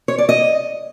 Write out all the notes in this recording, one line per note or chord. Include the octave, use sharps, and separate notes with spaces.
C#5
D5
D#5